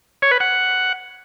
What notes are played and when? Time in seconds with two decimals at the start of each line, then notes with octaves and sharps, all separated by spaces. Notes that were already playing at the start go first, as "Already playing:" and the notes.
0.22 C#5
0.31 B4
0.40 F#5